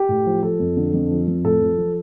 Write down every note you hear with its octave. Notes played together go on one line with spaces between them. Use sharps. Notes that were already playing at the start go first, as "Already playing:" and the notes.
Already playing: G4
A2
F3
F3 A4
F2
D3
F2
F3
F2
A2 A4
F3
F3